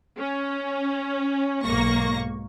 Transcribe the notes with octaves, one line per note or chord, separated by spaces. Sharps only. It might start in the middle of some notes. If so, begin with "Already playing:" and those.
C#4
B1 G#2 A#3 C#6 A#6